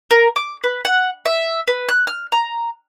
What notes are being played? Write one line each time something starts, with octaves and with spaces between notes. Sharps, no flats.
A#4
D6
B4
F#5
E5
B4
F#6
F6
A#5